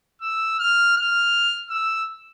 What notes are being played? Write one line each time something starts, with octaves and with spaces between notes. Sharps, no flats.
E6
F6
F6
E6